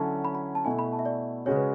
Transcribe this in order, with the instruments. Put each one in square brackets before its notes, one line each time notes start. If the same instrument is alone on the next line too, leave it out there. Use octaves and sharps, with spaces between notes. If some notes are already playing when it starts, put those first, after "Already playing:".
Already playing: [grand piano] D3 F#3 C#4 E4 [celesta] A5
[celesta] B5
B5
A5
[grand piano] B2 A3 E4 [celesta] G#5
[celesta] B5
A5
E5
D5
[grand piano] C#3 G#3 C#4 F#4 [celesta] C#5
[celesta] B4